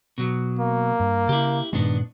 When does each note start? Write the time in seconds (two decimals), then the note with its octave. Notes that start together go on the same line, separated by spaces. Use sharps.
0.18 B2 F#3
0.59 A#3
1.00 G2
1.29 C#3 E4 G4
1.73 G2 A#2 D#3 G#3 B3 D4